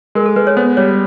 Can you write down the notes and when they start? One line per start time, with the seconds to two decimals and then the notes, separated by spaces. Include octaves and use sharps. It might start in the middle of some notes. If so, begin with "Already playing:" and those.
0.15 G#3 A#4
0.26 A4
0.36 G#3 B4
0.47 C#5
0.57 B3 C5
0.77 G3 C#5